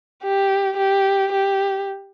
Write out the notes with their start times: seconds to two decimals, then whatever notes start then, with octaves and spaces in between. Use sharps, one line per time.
0.23 G4
0.77 G4
1.32 G4